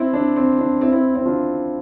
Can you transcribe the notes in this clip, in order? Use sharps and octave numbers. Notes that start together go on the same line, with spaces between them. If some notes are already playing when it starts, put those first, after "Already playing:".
Already playing: C4 E4
D4
C4
D4
C4 E4
C4 E4
C4 E4
D4 F4